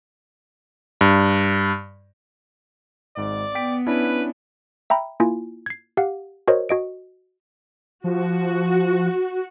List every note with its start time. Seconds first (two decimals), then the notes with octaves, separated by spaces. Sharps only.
1.01 G2
3.17 G#1 G#2 D5
3.55 B3 G5 B6 D7
3.87 C#4 D4 E4 B4
4.90 E5 G5 A#5 B5
5.20 A#3 E4 F4 G#5
5.66 G#6 C7
5.97 G4 F5 F#5
6.48 F#4 A#4 C5 C#5 D#5
6.69 F#4 D#5 D7
8.04 F3 F#4